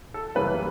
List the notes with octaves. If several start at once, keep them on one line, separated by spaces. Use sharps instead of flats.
A4
F#2 C#3 E3 G3 A#3 B4